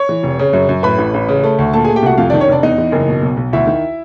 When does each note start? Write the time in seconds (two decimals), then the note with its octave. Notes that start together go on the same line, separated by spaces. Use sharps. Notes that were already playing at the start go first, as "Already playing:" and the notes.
Already playing: C#5 C#6
0.09 E3
0.23 F1
0.39 C#3
0.53 F#2
0.69 F#2
0.83 A2 B4 B5
0.98 A1
1.14 A1
1.29 C#3
1.44 A3
1.58 D2
1.73 A#2 A4 A5
1.85 G#4 G#5
1.88 A3
1.96 G4 G5
2.03 C2 F#4 F#5
2.17 F2 F4 F5
2.30 D4 D5
2.34 D#3
2.40 C#4 C#5
2.48 F1 D4 D5
2.63 E2 D#4 D#5
2.78 E3
2.92 F#1
3.08 B2
3.23 B1
3.37 B1
3.53 D2 E4 E5
3.67 D#3